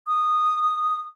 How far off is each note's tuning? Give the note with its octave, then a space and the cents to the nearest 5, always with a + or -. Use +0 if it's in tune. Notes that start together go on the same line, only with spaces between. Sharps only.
D#6 -10